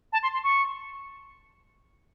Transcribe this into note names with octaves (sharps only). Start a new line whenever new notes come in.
A5
C6
C6
C#6